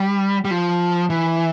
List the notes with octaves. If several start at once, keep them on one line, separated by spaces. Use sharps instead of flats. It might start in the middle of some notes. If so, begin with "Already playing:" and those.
Already playing: G3
G3
F3
E3